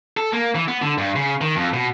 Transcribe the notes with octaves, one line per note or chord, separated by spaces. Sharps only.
A4
A#3
E3
B3
D3
G2
C#3
D#3
F2
B2